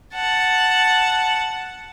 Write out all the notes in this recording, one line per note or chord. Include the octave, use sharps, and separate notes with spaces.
F#5 A5